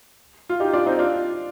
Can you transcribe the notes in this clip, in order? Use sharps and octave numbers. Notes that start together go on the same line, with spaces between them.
F4
D#4 G4
D4 F4
C4 D#4
D4 F4